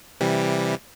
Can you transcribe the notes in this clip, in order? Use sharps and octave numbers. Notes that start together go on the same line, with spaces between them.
C3 E3 G3